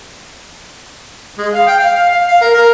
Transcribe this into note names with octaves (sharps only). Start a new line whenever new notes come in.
G#3
F5
G5
F5
F5
F5
F5
A#4
A#4